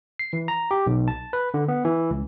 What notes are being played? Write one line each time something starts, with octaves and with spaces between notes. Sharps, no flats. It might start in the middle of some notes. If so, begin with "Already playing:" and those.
C7
E3
A#5
G4
B1
A5
B4
D3
B3
E3
C#2